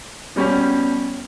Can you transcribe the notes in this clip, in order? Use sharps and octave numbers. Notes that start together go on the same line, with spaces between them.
B2 G3 C#4 G4